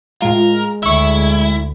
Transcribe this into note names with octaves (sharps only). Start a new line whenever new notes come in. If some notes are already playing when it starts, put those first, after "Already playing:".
A2 G#3 F4 A#4
D2 E4 E5 C#6